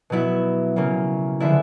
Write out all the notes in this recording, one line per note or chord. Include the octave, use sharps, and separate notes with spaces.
B2 F#3 B3 E4 E5
C#3 F#3 A#3 C#4
D3 F3 G#3 B3 E4 E5